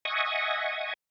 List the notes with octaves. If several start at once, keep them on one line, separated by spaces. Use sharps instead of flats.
D#5 E5 F#5 G#5 C#6 D#6